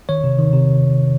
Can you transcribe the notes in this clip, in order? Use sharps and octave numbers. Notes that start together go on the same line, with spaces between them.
D#3 C#5
C3
D#3
C3